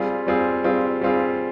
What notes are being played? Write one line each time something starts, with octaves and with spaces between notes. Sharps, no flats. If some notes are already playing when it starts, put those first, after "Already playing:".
Already playing: G3 C4 F4 G#4
G3 C4 F4 G#4
G3 C4 F4 G#4
G3 C4 F4 G#4